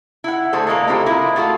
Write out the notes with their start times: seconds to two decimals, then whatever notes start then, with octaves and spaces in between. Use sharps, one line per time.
0.24 E4 F#5
0.53 D3 A3 G#4 A4 C5
0.67 A2 G#3 A#3 A#5
0.87 A3 C4 E4 F4 G4 A4
1.06 G#3 E4 F4 A#4
1.36 A3 F4 F#4 G#4 A4